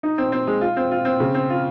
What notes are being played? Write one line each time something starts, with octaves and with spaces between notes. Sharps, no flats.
D#4
C4
C4
G#3
F4
C4
F4
C4
C#3
C4
F4